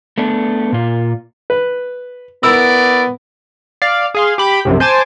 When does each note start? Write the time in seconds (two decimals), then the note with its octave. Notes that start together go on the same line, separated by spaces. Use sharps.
0.18 A3 B3 D4
0.72 A#2 F4
1.50 B4
2.43 B3 E4 A#4 D5 E6
3.82 D5 F5
4.14 G#4 F5 C6
4.38 G4 B5 D6 G6
4.65 A#1 F#2 C3
4.80 C5 G#5 A5 D6 A6